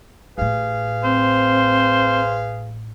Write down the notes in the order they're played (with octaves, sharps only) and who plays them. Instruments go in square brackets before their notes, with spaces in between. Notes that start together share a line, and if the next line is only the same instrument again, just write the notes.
[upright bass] A1 A2 [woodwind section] G#4 B4 F5
[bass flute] C4 [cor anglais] C5